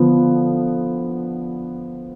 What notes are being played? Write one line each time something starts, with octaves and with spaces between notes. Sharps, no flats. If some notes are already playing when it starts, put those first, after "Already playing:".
Already playing: D3 F3 B3